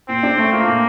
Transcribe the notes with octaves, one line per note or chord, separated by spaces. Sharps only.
A#2 C4
D4
A3
A#3 F4
A#2